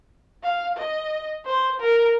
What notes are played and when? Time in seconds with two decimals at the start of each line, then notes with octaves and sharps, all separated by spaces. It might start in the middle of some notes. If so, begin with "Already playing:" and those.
0.43 F5
0.77 D#5
1.46 C5
1.80 A#4